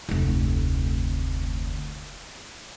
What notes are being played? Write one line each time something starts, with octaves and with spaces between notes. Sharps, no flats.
F1 D2